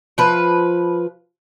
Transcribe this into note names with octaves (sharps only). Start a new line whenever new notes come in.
F3 B4